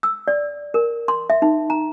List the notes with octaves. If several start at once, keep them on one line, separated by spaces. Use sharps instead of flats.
E6
D5
A#4
C6
E5
D#4
A#5